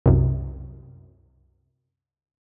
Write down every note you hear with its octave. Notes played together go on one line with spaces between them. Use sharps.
C2 F#2